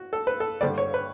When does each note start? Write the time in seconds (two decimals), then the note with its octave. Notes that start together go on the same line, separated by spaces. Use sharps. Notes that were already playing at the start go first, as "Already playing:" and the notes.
Already playing: F#4
0.13 A4
0.27 B4
0.40 A4
0.61 G2 D3 G3 D5
0.78 C#5
0.94 B4